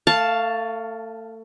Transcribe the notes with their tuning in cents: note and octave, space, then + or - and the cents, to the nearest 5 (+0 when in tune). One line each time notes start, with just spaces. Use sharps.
A3 +30 F5 +0 A5 +5